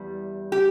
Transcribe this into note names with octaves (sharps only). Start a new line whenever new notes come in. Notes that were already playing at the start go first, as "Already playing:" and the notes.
Already playing: E2 G3
G4